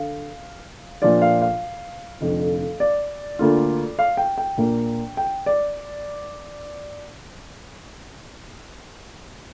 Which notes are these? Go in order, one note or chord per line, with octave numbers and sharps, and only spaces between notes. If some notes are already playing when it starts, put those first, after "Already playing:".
Already playing: D3 F5
A#2 F3 D4 F4 D5
F5
F5
F1 F2 D3 F3
D5
D2 D3 A#3 F4
F5
G5
G5
A#1 A#2 A#3
G5
D5